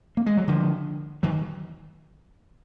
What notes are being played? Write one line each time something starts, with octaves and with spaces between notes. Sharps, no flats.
A#3
G#3
F#3
D3 F3
D#3 F#3